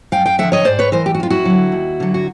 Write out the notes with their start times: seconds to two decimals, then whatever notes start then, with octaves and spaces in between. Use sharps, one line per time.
0.12 F#2 F5 G5
0.26 F5 G5
0.38 D3 F3 E5 F#5
0.52 C#5 D#5
0.65 G#2 C5 D5
0.79 B4 C#5
0.92 E3 A#4 C5
1.06 G4
1.15 F#4
1.20 F2 F4
1.30 E4 F#4
1.45 D3 F#3
1.72 D#2
2.00 D3 F#3
2.14 F#4